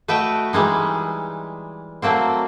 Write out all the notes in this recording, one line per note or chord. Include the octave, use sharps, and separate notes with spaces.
A3 F#4 B4 D#5 E5 G5
E3 G3 G#3 D#4
F#3 A3 A#3 C4